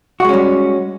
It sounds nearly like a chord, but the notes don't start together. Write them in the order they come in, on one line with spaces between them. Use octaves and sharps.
F#4 G#3 C#4 G3